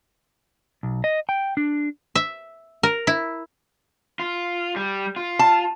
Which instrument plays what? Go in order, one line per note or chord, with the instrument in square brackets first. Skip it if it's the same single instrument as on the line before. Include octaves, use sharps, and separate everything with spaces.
[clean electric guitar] B1
D#5
G5
D4
[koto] E5
A#4
E4
[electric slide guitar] F4
G3
F4
[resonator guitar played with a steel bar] A5